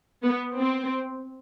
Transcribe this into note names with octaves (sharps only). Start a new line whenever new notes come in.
B3
C4